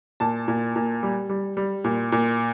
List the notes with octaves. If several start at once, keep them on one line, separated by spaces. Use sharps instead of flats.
A#2 A5
A#2
A#2
G3
G3
G3
A#2
A#2